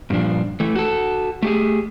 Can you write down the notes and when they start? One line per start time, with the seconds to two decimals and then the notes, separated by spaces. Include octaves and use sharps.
0.10 G2 A#2 F3 D4
0.60 E3 A3
0.75 F#4 A4
1.42 A3 G4 G#4